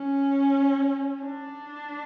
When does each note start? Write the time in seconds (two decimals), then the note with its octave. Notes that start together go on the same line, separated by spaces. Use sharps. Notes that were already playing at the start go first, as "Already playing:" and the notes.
Already playing: C#4
1.23 D4